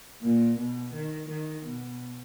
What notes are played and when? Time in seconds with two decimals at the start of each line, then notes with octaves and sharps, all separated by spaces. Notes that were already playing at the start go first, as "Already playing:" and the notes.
0.22 A#2
0.58 B2
0.93 D#3
1.29 D#3
1.65 B2